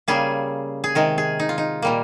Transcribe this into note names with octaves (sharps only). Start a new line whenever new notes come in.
C#3 G3 A#3 G#4
G#4
C3 D#3 G#3 A#4
G#4
D#4
F4
D#4
A#2 G3 A#3